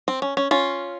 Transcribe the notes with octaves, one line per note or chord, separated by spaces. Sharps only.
C4
C#4
C#4
C#4 F4